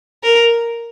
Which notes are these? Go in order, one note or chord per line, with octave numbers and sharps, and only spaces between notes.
A#4